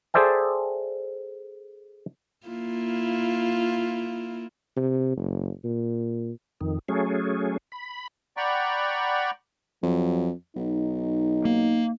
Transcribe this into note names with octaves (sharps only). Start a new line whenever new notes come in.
G#4 A4 C5 D5 E5 G5
A#3 E4 F4
C3
F#1
A#2
F2 D#3
F#3 A3 C#4 G#4
B5
D5 F#5 G5 A#5 B5 C#6
F2 F#3
B1 D#4
A#3